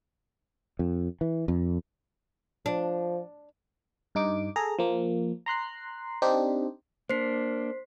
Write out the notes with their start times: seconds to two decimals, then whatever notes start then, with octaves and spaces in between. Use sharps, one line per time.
0.79 F2
1.21 E3
1.48 F2
2.66 F3 D4
4.15 G2 D#4 D6
4.56 G#4 A4 A#5
4.79 F3 A#3
5.46 A#5 C6 F#6 C7
6.22 C4 D4 D#4 G4 C5
7.10 A#3 D4 C5 B6 C7